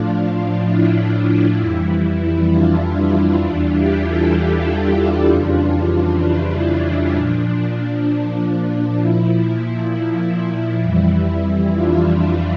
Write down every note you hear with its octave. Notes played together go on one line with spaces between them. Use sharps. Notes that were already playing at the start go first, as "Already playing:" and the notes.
Already playing: A2 F3 D4 F4
D4
E4
F2 E3 G3
D4 F4
E2 E3 G3 D4 F4
E4 G4
F4 A4
E4 G4
D4 F4
F2 C#3 E3 G3
E4
D4
A#2 F3 D4
A#2 F3 E4
F2 E3 G3
D4 F4